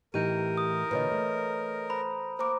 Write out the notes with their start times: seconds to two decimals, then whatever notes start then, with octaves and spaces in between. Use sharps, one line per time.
0.14 A2 E3 D#4 G4 A#4 G6 D#7
0.57 D#6
0.91 A#2 D3 B4 C#5 D#5
1.12 A3
1.90 C5 A#5 B5
2.39 A#3 A#4 C5 A#5 D6